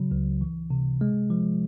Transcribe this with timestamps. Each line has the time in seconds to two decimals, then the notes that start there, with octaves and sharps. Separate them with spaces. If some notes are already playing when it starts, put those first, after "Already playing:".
Already playing: C#3 F#3
0.11 C#2
0.41 E3
0.70 C3
1.01 G#3
1.30 F3